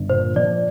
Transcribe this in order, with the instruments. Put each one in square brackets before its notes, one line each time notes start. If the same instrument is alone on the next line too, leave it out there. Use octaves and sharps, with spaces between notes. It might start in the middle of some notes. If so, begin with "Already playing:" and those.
Already playing: [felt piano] G1
[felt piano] A#2 [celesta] C5
[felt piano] F3 [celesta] D5